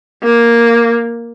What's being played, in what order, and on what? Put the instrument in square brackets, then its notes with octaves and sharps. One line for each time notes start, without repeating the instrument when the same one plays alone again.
[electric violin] A#3